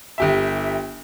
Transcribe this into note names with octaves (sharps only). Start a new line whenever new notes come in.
G1 G4 E5